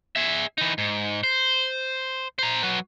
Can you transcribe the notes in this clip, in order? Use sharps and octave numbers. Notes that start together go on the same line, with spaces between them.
G#4 E5
E3 D#4
G#2
C5
C5 A#5
F#3 B4